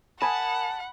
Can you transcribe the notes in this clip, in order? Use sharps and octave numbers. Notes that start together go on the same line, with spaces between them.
A#4 F#5 G#5 A5 B5 D#6